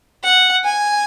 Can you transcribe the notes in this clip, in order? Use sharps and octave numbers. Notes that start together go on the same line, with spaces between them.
F#5
G#5